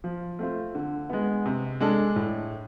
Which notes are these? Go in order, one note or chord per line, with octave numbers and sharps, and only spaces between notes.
F3
A3 C4 F4
D3
G#3 B3
C3
G#3 D4 A4
A2